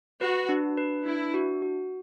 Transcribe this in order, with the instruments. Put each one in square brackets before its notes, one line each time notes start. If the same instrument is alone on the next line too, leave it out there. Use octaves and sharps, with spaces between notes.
[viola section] F#4 [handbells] B4
[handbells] D4
B4
[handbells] D4 [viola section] E4
[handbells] F#4
F#4